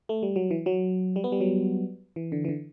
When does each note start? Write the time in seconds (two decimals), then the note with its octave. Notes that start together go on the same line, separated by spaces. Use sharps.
0.09 A3
0.23 G3
0.36 F#3
0.51 E3
0.66 F#3
1.16 G3
1.24 B3
1.32 G3
1.40 F#3
2.16 E3
2.32 D3
2.45 E3
2.49 D3